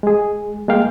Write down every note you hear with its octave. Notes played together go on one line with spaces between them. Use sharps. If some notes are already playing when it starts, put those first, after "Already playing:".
G#3 G#4
G#3 A#3 F5 G5